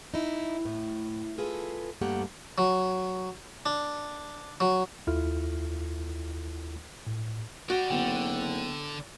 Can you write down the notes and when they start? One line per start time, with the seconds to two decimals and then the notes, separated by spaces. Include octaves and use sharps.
0.14 D#4 E4
0.65 A2
1.38 F4 G#4 A4 B4
2.01 G2 A3 A#3 G4 F#5 A#5
2.58 F#3
3.66 D4
4.60 F#3
5.07 D#2 E4 F4 A4 F6
7.07 A2
7.70 F#4 D5 G5
7.91 F#1 D3 B3 G5